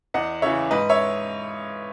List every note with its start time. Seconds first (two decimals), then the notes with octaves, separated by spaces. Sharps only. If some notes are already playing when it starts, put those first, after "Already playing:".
0.14 E2 D#5 F#5
0.42 C#3 E3 C#5 E5
0.71 G#2 B4 D#5
0.89 C#5 E5